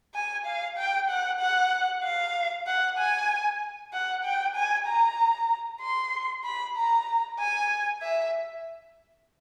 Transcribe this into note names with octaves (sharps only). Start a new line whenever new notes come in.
G#5
F5
G5
F#5
F#5
F5
F#5
G#5
F#5
G5
G#5
A#5
C6
B5
A#5
G#5
E5